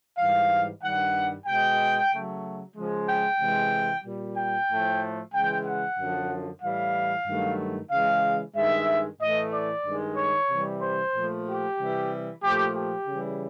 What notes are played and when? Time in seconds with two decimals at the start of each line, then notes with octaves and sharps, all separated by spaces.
0.17 G#2 E3 G3 F5
0.82 G2 D#3 G3 F#5
1.46 B2 G#3 G5
2.11 C#3 F#3 A3
2.76 C#3 F3 G#3
3.07 G5
3.40 C3 E3 G#3
4.04 A#2 G3
4.36 G5
4.69 A2 F3 A3
5.33 C#3 E3 G#3 G5
5.66 F#5
5.98 F#2 D3 F3
6.62 A2 E3 G3 F5
7.27 G2 D#3 F#3 A3
7.91 C#3 E3 G#3 F5
8.55 G2 D#3 G#3 E5
9.20 A2 E3 A3 D#5
9.52 D5
9.84 G2 D#3 G#3
10.16 C#5
10.49 C3 E3 G3
10.81 C5
11.13 A#2 F3 A3
11.46 G4
11.78 C3 E3 G3
12.42 A#2 F3 A3 G4
12.75 G4
13.07 C#3 E3 G3